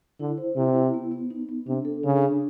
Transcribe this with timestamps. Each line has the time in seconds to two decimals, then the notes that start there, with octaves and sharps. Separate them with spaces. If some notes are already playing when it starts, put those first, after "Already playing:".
0.20 D3 E4
0.38 C5
0.56 C3 E4
0.75 E4
0.94 B3
1.11 B3
1.30 D#4
1.49 B3
1.67 C3 D4
1.85 A4
2.03 C#3 D4
2.22 D4